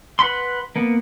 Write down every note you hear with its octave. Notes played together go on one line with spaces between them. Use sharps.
B4 F#5 B5 C6
A#3 B3